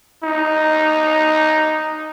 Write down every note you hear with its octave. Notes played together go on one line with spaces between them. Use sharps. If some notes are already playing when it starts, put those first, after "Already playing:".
D#4